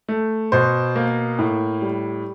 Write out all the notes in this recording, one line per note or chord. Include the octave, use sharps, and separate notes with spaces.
A3
B2 C5
A#3
A2
G3